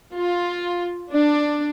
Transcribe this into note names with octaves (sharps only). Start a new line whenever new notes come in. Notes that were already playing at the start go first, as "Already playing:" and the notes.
F4
D4